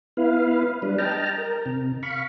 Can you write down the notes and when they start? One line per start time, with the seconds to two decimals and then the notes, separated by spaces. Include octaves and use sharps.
0.17 B3 E4 B4 F5
0.82 G3 D4 B4
0.98 D#5 G5 A5 A#5 F6
1.38 A#4
1.66 C3
2.03 F5 B5 C#6